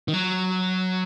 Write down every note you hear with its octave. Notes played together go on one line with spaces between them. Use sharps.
D#3
F#3